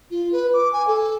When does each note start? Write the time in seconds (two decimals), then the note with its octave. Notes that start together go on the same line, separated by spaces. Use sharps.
0.11 F4
0.32 B4
0.54 D6
0.73 G#5
0.87 A4